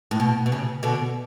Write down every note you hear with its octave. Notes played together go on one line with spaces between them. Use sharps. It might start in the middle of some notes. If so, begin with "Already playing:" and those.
A2
B2
B2
C#3
B2 D3